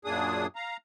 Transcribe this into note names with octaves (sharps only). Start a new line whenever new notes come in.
F#2 A#2 D4 G#4 D#6
F5 A#5